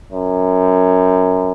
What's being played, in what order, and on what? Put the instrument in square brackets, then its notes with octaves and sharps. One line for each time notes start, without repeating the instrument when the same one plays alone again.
[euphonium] F#2